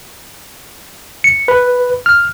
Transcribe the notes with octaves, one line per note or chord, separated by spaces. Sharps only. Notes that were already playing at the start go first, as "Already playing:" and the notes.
C#7
B4
F6